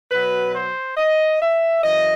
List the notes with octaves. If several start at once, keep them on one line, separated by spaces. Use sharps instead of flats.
B2 F#3 B4
C5
D#5
E5
F#2 E3 D#5